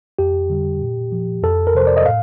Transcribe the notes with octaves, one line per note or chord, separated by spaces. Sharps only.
F2 G4
D3 G3
A#2
F3
F2 A4
A#4
C3 F3 C5
D5
D#5
A2 F5